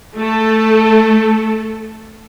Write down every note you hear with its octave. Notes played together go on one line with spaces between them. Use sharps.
A3 A4